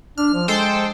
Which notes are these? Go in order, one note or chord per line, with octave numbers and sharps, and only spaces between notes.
D4 F6
F3
G#3 A4 C5 G5